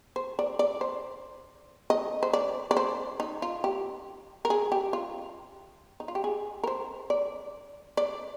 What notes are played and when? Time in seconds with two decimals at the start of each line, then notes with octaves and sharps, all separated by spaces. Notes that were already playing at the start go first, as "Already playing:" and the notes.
0.16 C5
0.39 D5
0.59 D5
0.81 C5
1.90 D#5
2.23 C5
2.33 D5
2.71 D5
2.77 C5
3.20 D#4
3.42 F4
3.64 G4
4.45 A#4
4.50 G#4
4.72 G4
4.93 F4
6.00 D#4
6.08 F4
6.15 G4
6.24 G#4
6.63 A#4
6.67 C5
7.10 D5
7.97 D5